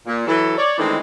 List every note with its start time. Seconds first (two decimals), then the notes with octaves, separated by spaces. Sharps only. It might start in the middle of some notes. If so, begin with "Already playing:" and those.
0.06 A#2
0.27 E3 F#3 A4
0.58 C#5 D5
0.78 D#3 E3 G#3 A3 C4 D4